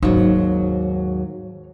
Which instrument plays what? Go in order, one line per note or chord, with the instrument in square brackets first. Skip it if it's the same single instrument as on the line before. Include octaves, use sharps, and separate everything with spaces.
[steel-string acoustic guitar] D#2 G#2 F#3 [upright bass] D#4